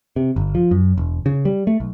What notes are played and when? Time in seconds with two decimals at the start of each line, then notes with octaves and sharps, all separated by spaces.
0.16 C3
0.36 G1
0.55 F3
0.71 F#2
0.97 E1
1.26 C#3
1.45 G3
1.67 A3
1.80 B1